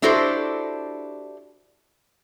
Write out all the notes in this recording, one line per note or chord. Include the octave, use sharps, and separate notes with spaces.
D4 E4 F#4 G4 A4 C5